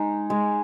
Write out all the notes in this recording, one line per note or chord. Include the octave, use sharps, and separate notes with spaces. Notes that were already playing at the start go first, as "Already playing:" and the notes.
Already playing: G#3 D#4
G#3